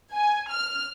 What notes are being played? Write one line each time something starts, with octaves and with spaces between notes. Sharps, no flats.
G#5
F6